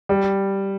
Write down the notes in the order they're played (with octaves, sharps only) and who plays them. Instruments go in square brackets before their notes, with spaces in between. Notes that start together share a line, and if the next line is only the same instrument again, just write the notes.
[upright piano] G3